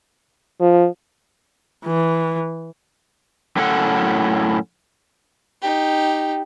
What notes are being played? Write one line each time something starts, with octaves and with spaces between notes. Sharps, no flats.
F3
E3
F#2 A2 C#4 D4 A4 F#5
D#4 G4